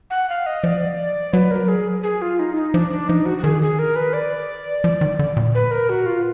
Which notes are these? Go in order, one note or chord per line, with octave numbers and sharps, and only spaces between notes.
F#5
F5
D#5
F3 D5
F#3 B4
A#4
G#4
G#4
F4
D#4
D#4
F3 D4
D4
F3 D#4
F#4
F#4
D#3 G#4
G#4
A#4
B4
D5
F3
D#3
D3
A#2
B4
A#4
F#4
F4